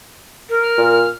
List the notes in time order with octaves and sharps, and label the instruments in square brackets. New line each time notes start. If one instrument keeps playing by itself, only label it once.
[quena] A#4
[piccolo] F6
[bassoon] A#2